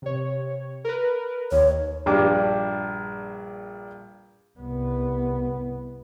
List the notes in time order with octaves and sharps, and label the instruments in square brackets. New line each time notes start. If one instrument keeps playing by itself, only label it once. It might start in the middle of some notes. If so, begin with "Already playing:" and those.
[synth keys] C3 C#5
A#4 B4
[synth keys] D#2 [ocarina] C#5
[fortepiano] A#1 G2 D4 D6
[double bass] C2 B3